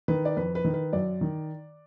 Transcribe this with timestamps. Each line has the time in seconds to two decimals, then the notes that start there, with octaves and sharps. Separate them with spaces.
0.08 D#3 B4
0.25 D5
0.37 F2 B4
0.55 B4
0.65 D#3
0.74 B4
0.93 F#2 D5
1.21 D#3